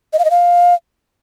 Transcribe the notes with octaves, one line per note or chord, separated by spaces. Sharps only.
D#5
F5
D#5
F5